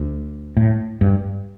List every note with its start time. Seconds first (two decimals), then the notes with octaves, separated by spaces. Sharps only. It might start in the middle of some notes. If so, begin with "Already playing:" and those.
Already playing: D2
0.57 A2
1.01 G2